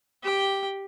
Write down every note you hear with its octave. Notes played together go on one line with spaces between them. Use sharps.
G4 G5